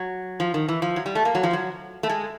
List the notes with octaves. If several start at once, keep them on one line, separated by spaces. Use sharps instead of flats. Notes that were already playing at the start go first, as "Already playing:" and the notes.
Already playing: F#3
F3
D#3
E3
F3
F#3
G3
A3
A#3
F#3
F3
F#3
A3
G#3